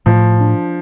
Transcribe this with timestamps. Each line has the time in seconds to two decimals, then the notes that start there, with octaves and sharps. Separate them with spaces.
0.06 A2 F3
0.40 D4